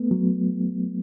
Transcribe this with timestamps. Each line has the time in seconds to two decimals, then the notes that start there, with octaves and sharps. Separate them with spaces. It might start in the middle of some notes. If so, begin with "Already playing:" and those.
Already playing: A3 B3
0.11 F#3